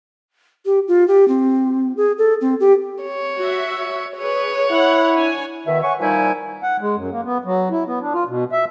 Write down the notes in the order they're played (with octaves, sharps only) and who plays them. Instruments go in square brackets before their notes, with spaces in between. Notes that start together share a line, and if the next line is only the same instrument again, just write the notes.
[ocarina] G4
F4
G4
C4
G#4
A4
C4
G4
[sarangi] C#5
[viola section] F#4 E5
[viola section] G#4 B4 [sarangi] C#5
[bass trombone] E4 [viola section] F#5
[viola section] D4 C#5 G#5
[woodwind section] B2 D#3 E5
C#5 E5 F#5 G#5 C#6
A#2 F3 G3 D#4 E4 G#5
[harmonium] F#5
G#3
F#2
A#3
B3
F#3
E4
B3
D4
F4
B2
E5